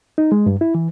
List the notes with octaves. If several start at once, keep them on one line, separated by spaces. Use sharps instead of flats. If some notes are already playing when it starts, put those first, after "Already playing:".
D#4
G#3
G2
E4
E3